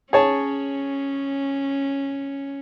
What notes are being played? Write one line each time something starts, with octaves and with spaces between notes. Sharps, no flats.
C#4 G#4 C#5 A5